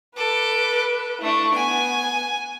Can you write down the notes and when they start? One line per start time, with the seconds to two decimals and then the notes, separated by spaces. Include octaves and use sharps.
0.17 A4 B4 D6
1.21 A3 D4 E4 C#6
1.54 B3 G#5